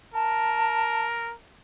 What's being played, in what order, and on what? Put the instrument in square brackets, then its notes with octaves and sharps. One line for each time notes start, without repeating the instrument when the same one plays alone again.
[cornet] A#4 [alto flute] A5